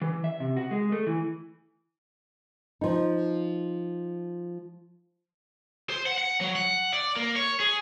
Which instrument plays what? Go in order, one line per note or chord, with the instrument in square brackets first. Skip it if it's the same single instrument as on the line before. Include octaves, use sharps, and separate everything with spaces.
[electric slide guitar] E3
E5
C3
F#4
G#3
A3
E3
[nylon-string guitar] F3 D#4
[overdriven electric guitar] C5
F#5
F#5
F#3
F#5
D5
A#3
C#5
G#4